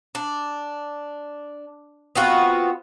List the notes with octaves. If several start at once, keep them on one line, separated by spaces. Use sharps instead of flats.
D4
B3 C4 F4 F#4